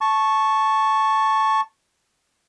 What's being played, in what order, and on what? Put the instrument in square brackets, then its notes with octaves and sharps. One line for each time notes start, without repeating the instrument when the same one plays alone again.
[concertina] A5 C#6